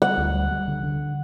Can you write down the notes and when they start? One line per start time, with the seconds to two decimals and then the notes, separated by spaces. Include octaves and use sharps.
0.02 G3 F#5
0.18 D2
0.34 G3
0.51 G3
0.68 D3
0.83 D3